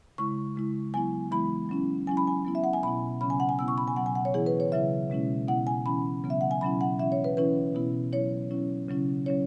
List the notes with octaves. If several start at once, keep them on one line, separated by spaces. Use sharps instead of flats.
C#3 G#3 E4 C#6
C#3 G#3 E4
F#3 B3 E4 G#5
E3 G#3 B3 E4 B5
F#3 C#4 E4
F#3 C#4 E4 G#5
B5
G#5
F#3 B3 E4
E5
F#5
G#5
B2 B3 E4 B5
C#3 F#3 C#4 B5
G#5
F#5
G#5
B2 B3 E4 E6
C#6
B5
G#5
B2 F#3 B3 F#5
G#5
F#5
C#5
E3 B3 E4 G#4
B4
C#5
C#3 F#3 E4 E5
B2 G#3 C#4 E4
B2 B3 E4 F#5
G#5
E3 C#4 E4 B5
C#3 F#3 B3
E5
F#5
G#5
B2 F#3 C#4 E4 B5
F#5
E3 C#4 E4 E5
C#5
B4
E3 C#4 E4 B4
B2 B3 E4
F#3 E4 C#5
F#3 C#4 E4
C#3 F#3 C#4 E4
F#3 C#4 E4 C#5